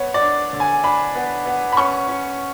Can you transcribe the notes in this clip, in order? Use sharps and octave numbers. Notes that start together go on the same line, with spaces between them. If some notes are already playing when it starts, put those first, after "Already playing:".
Already playing: B3 C#5
D5
D4
D3
G#5
D4 B5
B3
B3
B5
C#4 C#6
C#4